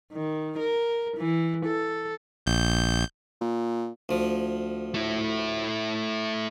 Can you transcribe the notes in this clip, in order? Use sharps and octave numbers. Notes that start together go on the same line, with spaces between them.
D#3
A#4
E3
A4
A#1 G6
A#2
D2 F3
A3 E4